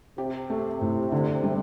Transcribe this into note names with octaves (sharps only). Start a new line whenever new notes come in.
C3 G4
A3
A2
D3
G3